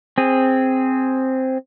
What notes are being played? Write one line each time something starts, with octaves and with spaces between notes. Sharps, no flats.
C4 G#4